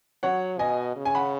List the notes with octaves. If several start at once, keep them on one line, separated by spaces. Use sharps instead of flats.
F#3 C#5 F#5
B2 D#5 G#5
C#3
G#5
F#5 B5